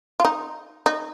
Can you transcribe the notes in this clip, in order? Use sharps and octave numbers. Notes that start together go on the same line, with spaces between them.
F4
D#4
D#4